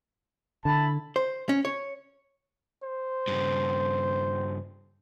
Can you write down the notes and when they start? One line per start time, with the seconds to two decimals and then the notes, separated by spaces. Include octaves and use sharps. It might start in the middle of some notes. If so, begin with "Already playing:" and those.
0.65 D3 E4 A5 B5
1.16 C5
1.49 C#4
1.65 C#5
2.83 C5
3.28 G2 C#3